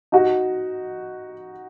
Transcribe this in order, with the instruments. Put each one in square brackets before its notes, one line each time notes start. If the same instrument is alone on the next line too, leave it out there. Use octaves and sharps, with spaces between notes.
[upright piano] D#4 F#4